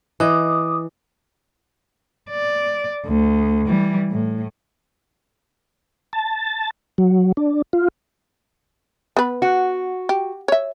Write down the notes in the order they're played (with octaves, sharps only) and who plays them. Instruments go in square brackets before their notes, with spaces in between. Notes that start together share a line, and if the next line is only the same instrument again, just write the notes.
[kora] E3 D#5 [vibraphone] D6 D#6
[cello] D5
D2
E3 G3
A2
[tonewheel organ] A5
F#3
D4
F4
[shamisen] B3 B4
[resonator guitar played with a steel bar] F#4
[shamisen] G4
C#5 E5